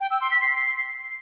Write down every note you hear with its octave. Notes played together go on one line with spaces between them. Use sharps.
G5
E6
C6
B6
C7